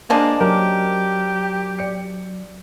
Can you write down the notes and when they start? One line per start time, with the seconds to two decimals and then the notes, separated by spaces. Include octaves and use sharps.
0.10 F3 G#3 A#3 D4
0.41 F#3 C#4 G4 A#4
1.79 D5 C#7